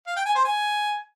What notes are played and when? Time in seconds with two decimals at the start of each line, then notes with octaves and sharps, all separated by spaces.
0.07 F5
0.16 G5
0.26 G#5
0.35 C5
0.45 G#5